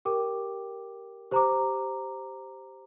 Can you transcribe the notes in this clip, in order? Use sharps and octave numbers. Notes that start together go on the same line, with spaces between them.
G4 A#4 G5 D6
G4 C5 A#5 D6